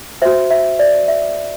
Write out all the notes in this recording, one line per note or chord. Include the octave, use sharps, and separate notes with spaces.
F#4 C5 E5
E5
D5
E5